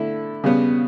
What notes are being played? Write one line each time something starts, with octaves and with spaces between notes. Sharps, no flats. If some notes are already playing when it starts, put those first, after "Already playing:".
Already playing: D3 A3 E4
C#3 G3 B3